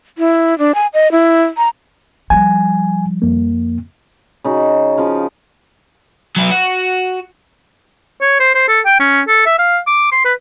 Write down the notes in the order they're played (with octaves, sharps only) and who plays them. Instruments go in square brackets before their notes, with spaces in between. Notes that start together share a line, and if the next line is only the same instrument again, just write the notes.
[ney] E4
D4
G#5
D#5
E4
A#5
[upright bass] F3 G3 [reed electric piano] G#5
[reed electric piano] F2 A#3
[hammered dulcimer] C#3 D#4 F#4
C#3 F3 F5
[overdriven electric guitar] F#3 B4
F#4
[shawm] C#5
C5
C5
A4
G5
C#4
A4
E5
F5
D6
C6
B4